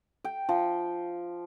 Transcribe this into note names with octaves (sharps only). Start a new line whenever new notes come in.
G5
F3